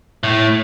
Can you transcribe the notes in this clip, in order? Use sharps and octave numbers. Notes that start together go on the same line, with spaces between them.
A2